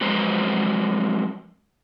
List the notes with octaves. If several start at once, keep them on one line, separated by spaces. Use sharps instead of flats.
F2 F#3 G#3 B4 C5 A#5